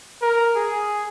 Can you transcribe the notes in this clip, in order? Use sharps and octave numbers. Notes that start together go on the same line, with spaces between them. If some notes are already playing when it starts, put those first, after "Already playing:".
A#4
G#4